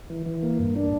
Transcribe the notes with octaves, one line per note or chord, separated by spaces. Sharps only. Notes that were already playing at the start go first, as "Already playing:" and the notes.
E3
E3
A#3
G2
D4